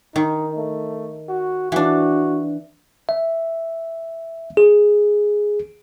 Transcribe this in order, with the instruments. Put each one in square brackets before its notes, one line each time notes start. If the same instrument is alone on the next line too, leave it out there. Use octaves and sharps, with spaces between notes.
[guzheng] D#3 [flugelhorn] D#4
[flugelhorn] A3
F#4
[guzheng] E3 D4 [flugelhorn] F#4
[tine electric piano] E5
G#4